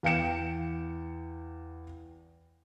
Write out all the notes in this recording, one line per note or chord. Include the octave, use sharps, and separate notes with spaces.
E2 F5 G5 C#7 E7